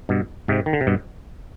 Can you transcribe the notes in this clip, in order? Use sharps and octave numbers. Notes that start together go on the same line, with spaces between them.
G2 B2
G#2 C3
D#3
D3
C3
G2 B2